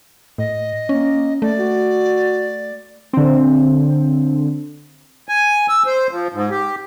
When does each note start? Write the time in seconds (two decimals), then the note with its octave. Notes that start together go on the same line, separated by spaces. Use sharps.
0.38 A2 D#5
0.89 A#3 C#4
1.42 A3 D5
1.59 F#4
3.13 D3 C4
5.29 G#5
5.69 E6
5.86 C5
6.11 F3
6.33 G#2
6.50 G4